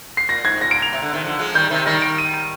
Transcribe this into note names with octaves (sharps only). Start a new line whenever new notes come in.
C7
A#2 A#6
G#2 G#6
A#2 A#6
D7
F7
C3
D3
C3 D#3
D3 F3
F3 G#3
D#3 G3 G6
C3 D#3
D#3 G3 A#6
D7
D#7
D#7